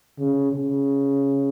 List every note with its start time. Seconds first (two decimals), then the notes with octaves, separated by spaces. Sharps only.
0.19 C#3
0.53 C#3